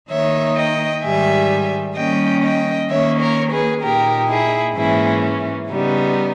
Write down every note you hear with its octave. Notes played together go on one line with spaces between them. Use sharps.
D#3 A#3 D#4 C#5 E5
D#5 G5
G#2 D#3 G3 E5 G#5
D#3 G3 A#3 C#4 D#5 G5
D#5 G5
D#3 A#3 C#4 C#5 E5
A#4 C#5
G#4 B4
A#2 A#3 D#4 G4 A#4
E4 G#4
G#2 E3 A#3 C#4 E4 G#4
C#3 G3 B3 D#4